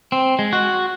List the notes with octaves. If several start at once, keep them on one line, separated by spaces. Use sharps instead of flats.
C4
G#3
F#4